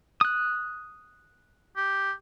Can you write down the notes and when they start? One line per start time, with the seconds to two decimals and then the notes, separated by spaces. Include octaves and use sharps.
0.21 D#6 F#6
1.77 G4